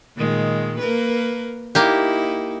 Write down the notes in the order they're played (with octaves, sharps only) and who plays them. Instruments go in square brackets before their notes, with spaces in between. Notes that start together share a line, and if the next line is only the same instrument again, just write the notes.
[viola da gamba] A#2 D#3 G#3
A#3 A#4 B4
[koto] A#3 G4 [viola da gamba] D#4 E4